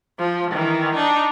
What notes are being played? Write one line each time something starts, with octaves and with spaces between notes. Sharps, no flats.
F3
D#3 E3
D4 D#4